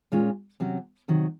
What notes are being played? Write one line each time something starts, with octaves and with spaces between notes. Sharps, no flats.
A#2 G#3 C#4 F4
C3 F#3 C#4
C3 D#3 F#3